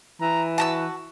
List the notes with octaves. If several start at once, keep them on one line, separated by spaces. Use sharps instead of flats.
E3 A#5
F#4 A5 A#5 E6